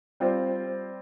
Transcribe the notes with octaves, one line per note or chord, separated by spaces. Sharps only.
G3 C4 F4 C5